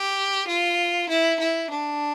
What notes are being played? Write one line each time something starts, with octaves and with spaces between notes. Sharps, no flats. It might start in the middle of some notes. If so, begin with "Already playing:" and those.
Already playing: G4
F4
E4
E4
D4